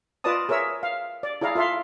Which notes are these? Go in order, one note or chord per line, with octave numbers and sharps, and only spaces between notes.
F4 B4 D5 D#5 A5 D#6
G#4 A#4 C#5 E5 E6
F5
D5
E4 G#4 D5 F5 A#5
F4 A4 E5 F5 C6